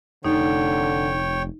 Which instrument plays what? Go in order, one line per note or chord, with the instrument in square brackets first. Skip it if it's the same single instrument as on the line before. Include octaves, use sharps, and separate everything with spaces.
[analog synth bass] F1 [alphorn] D3 [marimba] D#4 [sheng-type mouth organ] C#5 G5